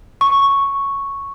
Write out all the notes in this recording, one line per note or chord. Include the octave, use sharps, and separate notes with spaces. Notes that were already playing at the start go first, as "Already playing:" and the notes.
C#6